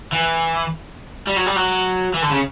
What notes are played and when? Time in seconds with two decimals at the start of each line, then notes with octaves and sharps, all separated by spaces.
0.12 E3
1.27 G3
1.37 F#3
1.46 G3
1.56 F#3
2.14 E3
2.23 D3
2.30 C#3